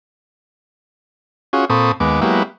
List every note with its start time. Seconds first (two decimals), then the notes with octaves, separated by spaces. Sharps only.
1.53 C#4 F4 F#4 G#4
1.70 A#2 C4 A4 B5 C#6 D#6
2.00 D#2 G#3 B3 D6
2.21 F#3 G#3 A#3 B3 E4 G4